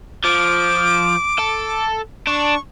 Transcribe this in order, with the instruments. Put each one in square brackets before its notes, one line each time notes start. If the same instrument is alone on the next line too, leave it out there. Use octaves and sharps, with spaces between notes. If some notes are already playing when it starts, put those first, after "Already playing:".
[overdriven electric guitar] F3 [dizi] D6
[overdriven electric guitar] A4
[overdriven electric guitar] D4 [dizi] C#6